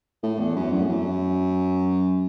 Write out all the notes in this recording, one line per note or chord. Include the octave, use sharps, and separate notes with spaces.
A2
E2
F#2
E2
A2
F#2